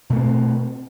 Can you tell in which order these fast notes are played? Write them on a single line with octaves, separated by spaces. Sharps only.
B2 A3 C4